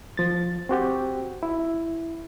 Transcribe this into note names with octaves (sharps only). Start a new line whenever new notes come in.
F3 A6
C4 F#4 G4
E4